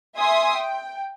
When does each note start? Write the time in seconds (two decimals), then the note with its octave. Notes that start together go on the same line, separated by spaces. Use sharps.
0.17 E5 G#5 C6 D#6
0.55 G5